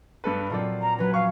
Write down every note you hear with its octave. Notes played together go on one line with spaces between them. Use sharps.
G2 A4 B4
A#2 F#3 C4 F4 A4 D5
A#5
F#3 C#4 B4
F5 C#6